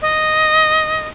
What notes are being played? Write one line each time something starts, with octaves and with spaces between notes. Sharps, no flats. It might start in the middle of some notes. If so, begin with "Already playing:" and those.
D#5